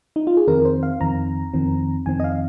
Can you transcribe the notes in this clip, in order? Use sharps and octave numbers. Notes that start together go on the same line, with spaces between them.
D#4
F4
G#4
F2 D#3 C4 A#4
C5
F5
F2 D#3 C4 A#5
F2 D#3 C4
F2 D#3 C4 G#5
D#5
F5